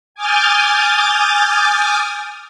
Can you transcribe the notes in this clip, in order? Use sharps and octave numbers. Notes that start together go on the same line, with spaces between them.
G#5 D6 D#6 F6 G6 A6